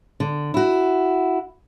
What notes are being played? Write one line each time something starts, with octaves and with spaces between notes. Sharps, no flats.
D3
E4 F#4